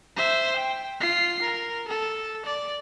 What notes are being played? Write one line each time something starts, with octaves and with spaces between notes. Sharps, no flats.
C5 E5
G5
F4 C7
A#4
A4
D5